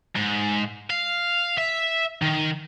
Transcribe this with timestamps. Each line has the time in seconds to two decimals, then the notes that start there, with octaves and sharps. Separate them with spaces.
0.16 G#2
0.90 F5
1.57 E5
2.22 D#3